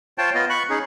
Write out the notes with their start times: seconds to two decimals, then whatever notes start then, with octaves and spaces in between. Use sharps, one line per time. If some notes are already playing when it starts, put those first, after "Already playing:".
0.18 F4 C5 C#5 G5 A5
0.34 B3 F4 D#5
0.50 B5 C#6 F#6
0.70 C#4 D#4 G#4